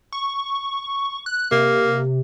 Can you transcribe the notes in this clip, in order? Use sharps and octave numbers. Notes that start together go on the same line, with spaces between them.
C#6
F#6
C3 A#3